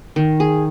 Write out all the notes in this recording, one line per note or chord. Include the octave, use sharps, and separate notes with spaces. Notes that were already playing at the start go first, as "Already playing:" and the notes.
D#3
G#4